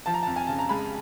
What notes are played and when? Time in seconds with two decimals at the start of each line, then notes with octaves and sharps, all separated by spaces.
0.06 F3 A5
0.14 A#5
0.23 F2 A5
0.36 G#5
0.47 C#3 A5
0.59 A#5
0.69 G#3 B5